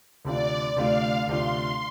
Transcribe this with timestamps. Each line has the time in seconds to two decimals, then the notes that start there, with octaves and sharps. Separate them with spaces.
0.25 D2 C3 A3 D4 F4 D5
0.76 D2 C3 A3 D4 F4 F5
1.27 D2 C3 A3 D4 F4 C6